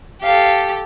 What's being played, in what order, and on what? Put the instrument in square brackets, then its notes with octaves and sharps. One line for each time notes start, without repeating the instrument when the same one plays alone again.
[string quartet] G4 A4 [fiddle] F5